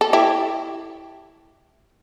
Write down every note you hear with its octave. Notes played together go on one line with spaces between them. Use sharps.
A4
E4 G4